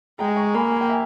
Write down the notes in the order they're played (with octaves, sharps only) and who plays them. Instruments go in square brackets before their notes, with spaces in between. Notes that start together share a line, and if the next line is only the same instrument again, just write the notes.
[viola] G#3 [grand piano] G5 A#5
[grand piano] A#5 C#6
[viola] A#3 [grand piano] G#5 B5
[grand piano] G#5
G5
E5 G#5